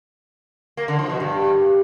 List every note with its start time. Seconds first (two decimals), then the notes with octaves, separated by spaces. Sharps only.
0.77 A#3
0.88 D3
0.99 F3
1.09 B2
1.20 G2